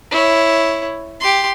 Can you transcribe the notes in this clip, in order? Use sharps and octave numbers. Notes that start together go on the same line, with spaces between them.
E4 C#5
G4 C6